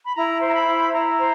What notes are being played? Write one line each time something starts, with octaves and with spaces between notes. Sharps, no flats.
B5
E4 A#5
C5
A#5
B5
E4
E4 A#5
C5